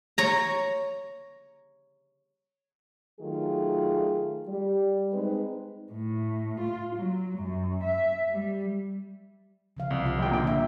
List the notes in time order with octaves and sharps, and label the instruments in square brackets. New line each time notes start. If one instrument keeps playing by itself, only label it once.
[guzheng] C#5 A#5
[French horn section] D#3 F#3 A3 F4 G#4
G3
G#3 C4 D#4 B4
[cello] A2
F4
F#3
F#2
E5
G3
[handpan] C#3 F3 F5
[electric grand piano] C2 [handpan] C4
[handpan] F4
[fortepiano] A#1 G5
A#2 D3 G5
[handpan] E5